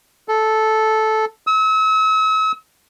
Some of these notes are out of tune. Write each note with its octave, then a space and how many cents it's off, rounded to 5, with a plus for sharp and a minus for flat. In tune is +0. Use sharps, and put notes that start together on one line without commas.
A4 -10
E6 -40